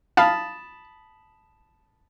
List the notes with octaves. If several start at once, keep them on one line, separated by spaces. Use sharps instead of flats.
F5 A5 B5 D#6